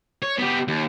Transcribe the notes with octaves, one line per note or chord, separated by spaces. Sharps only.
C#5
B3 G4
D#2